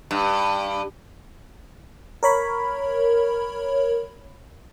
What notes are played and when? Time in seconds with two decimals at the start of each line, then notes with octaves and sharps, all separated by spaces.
0.11 G2
2.23 A#4 C#5 B5